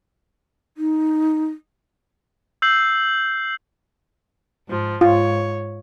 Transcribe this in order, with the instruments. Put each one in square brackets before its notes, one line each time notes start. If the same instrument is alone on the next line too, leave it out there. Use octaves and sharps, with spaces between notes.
[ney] D#4
[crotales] E6 G6 C7 F#7
[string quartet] G#2 F3
[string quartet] G#2 C#5 [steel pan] F4